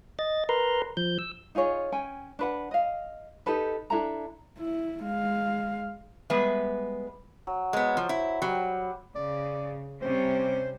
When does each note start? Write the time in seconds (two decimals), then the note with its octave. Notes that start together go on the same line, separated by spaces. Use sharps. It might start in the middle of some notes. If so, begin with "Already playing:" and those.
0.19 D#5 A6
0.49 A#4 B4 A#5 C6
0.97 F3 G6
1.19 E6
1.55 D#4 F4 G#4 C#5
1.92 C#4 G5 G#5
2.39 D4 B4 F#5
2.71 D#5 F5
3.46 D#4 G4 A4 B4
3.90 D4 E4 A4 A#5
4.59 E4
5.04 G#3 F5
6.30 G3 G#3 B3 B4 E5
7.47 F#3
7.73 G#3 B3 C5
7.97 F3
8.09 E4
8.42 F#3 G3
9.15 C#3 D5
10.02 C3 G3 C#4 C5